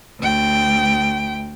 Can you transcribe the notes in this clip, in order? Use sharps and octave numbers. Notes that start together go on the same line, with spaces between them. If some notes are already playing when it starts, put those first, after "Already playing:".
D2 G5